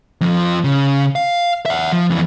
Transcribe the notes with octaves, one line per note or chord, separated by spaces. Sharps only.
F2 F3
C#3
F5
E5 F#5
F3
F2 E3